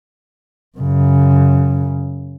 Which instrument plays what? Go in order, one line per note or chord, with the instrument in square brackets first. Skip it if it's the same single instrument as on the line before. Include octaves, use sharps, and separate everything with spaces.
[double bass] F#2 C#3